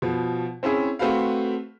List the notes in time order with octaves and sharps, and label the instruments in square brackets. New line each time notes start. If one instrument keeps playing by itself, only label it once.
[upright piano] B2 F3
C4 C#4 E4 G#4
A3 C4 F#4 B4 F5